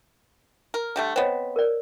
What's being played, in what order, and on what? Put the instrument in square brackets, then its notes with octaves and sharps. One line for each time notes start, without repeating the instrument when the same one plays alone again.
[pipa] A#4
D3 G3 A3
[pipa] B3 C4 [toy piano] C5 C#5 D#5
[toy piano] A#4 D5